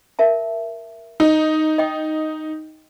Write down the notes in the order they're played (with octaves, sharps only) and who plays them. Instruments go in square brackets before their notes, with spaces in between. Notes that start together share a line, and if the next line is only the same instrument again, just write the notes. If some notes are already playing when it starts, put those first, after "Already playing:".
[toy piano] A#4 E5 A5
[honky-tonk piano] D#4
[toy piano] D#5 G5 D#6